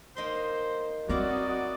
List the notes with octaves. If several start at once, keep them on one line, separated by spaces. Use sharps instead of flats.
A#3 D#4 C5 C6
F#3 C4 E4 F#4 D5 D#5 F5 A#5